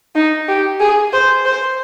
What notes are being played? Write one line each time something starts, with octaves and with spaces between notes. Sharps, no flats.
D#4
G4
G#4
C5
C5